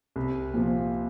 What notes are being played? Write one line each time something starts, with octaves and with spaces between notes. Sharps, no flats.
C2
A#2 F3